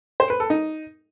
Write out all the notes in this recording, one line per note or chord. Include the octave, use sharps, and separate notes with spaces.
C5
B4
A4
D#4